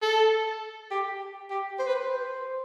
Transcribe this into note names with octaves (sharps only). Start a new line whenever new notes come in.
A4
G4
G4
C5
B4
C5